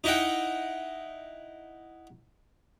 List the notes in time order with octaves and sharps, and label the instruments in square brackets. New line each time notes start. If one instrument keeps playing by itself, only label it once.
[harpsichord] D#4 E4 D#5 F#5 G5